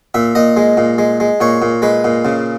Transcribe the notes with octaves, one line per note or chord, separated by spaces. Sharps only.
A#2 E5
A#2 D#5
G#3
A#2
G#3
G#3
A#2 C#5
A#2
G#3 B4
A#2
C#3